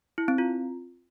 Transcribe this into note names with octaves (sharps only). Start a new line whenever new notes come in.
E4
C4
F4